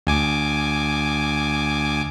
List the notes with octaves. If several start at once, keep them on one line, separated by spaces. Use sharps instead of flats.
D2 G#5 D6